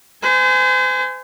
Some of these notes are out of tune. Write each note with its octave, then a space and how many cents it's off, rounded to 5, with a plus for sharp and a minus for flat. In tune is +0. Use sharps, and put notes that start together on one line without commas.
C5 -40 G#5 +0